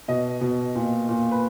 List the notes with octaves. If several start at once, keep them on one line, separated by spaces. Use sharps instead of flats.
B2 D#5
B2
A#2
A#2
B4